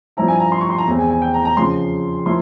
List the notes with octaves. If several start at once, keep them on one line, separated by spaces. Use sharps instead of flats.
G2 F3 C4 E4 A#5
G#5
A#5
C6
C#6
C6
A#5
E2 E3 G#3 C4
G#5
G#5
G5
A#5
A#5
F2 C#3 F3 C6
F3 A#3 E4 C6